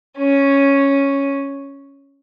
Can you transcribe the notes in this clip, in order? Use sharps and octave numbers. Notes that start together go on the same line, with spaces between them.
C#4